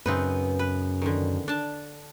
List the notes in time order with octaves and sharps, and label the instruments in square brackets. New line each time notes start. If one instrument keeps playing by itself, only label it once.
[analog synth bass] F#2 [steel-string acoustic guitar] C#3 B3 [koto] C4 D#4 B4
[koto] B4
D3 D#3
D4 A5